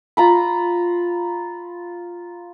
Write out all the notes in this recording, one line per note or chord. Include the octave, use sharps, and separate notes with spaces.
F4 A#5 B5